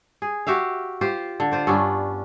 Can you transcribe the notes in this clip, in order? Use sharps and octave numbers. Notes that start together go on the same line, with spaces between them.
G#4
F#4 G4 E5 F5
F4 G4 C5
D3
F4 C5 D5
G2 B3 C#4 D4